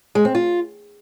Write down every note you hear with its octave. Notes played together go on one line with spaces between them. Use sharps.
G#3
C4
F4